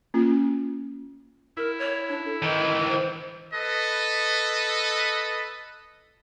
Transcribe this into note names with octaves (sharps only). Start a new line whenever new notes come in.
A#3 C#4 F4
E4 A#4
C#5
D4
A4
D#3 E3 D#5
C5
A4 B4 D#5